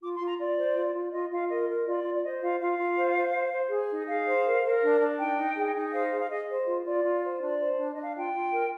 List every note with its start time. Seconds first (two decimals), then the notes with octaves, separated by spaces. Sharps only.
0.01 F4 D6
0.14 C6
0.20 F4
0.26 A#5
0.38 F4 D5
0.56 C5
0.76 F4
0.94 F4
1.12 F4 D#5
1.31 F4 F5
1.49 A#4 D#5
1.68 A#4
1.86 F4 D5
2.04 F4
2.13 D5
2.24 C5 D#5
2.42 F4 F5
2.60 F4 F5
2.79 F4
2.97 C5
3.15 C5
3.34 C5
3.52 C5
3.71 G#4
3.90 D#4
4.08 G#4 F5
4.27 C5
4.45 A#4
4.64 A#4
4.82 D4
5.00 D4
5.19 D#4 G5
5.38 D#4
5.57 G#4
5.74 D#4
5.93 C5 F5
6.12 G#4
6.19 F5
6.30 G#4 D#5
6.49 C5
6.66 F4
6.85 F4 D5
7.04 F4
7.22 C5
7.41 D4 D5
7.59 C5
7.78 D4 D5
7.91 D#5
7.97 D4
8.02 F5
8.15 F4 G5
8.33 F4
8.52 A#4